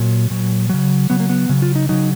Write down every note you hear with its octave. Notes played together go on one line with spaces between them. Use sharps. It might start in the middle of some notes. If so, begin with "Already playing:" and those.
Already playing: A#2 F#3
A#2 F#3
C#3 F#3
C#3 F#3 B3
A#3
B3
C#3 F#3
F4
D#4
C#3 F#3 D#4